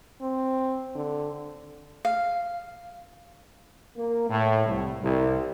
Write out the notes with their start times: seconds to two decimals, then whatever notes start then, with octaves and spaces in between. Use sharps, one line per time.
0.22 C4
0.95 D3
2.05 F5
3.97 A#3
4.30 A2
4.66 C2
5.02 C2